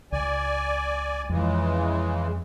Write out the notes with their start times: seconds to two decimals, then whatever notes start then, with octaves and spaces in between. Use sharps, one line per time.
0.12 C#2 D5 G#5
1.30 F2 C#3 E3 G#3